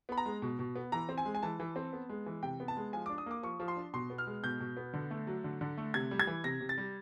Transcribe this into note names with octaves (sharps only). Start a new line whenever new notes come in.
B3 B5
A#5
G#3
B2
B2
B3
E3 A#5
C4
G#5
G#3
G#5
E3 A5
E3
C4
B3
G#3
E3
C3 G5
B3
A5
G#3
F3 G#5
D6
D4
D#6
A#3 D6
F3 C#6
F3
C6
D4
B2 C6
B3
F6
G#3
B2 G6
B2
B3
D3
A3
F#3
D3
D3
A3
C3 G#6
G3
G#6
E3
C3 A#6
C3
A6
G3